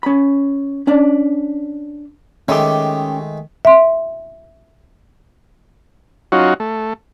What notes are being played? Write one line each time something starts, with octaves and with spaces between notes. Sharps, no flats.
C#4 B5
C#4 D4 D5
D#3 G#3 A3 C#4 G4
E5 C6
F#3 C#4 D#4 F4 F#4
A3